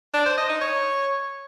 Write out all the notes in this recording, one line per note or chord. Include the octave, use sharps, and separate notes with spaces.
D4
C5
D#5
D#4
C#5